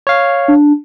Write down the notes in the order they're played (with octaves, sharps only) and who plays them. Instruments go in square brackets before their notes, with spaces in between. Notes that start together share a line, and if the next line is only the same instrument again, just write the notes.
[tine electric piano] C#5 F5
[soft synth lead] D4